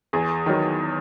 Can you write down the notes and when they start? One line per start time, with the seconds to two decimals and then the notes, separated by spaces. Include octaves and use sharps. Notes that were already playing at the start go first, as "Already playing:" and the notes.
0.13 E2 G#4
0.46 D#3 F#3